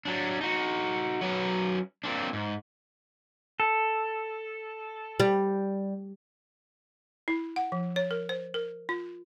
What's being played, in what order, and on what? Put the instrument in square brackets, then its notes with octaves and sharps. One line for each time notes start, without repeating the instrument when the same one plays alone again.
[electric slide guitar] F#3 D4
D#4 F#4
F#3 C#4 B4
A#3 C4 D4
G#2
[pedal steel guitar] A4
[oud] G3
[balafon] E4
F#5
F3
C#5
A#4
C5
A#4
F4